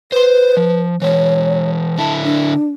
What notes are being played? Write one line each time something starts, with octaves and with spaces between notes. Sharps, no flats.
B4 C5 C6
F3
E3 G#3 C#5
D3 E4 A5
D4